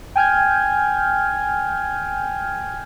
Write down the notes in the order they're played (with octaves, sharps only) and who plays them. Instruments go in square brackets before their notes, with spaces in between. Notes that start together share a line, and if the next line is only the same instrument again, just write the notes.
[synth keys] G5 G#5 F6 G6 G#6